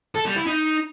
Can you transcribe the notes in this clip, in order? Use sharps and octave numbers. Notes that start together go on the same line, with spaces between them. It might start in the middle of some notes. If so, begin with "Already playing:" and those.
A4
G3
E4
D#4